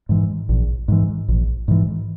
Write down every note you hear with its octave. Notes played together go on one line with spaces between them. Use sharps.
G#2 E3
A#1
G#2 E3
A#1
G#2 E3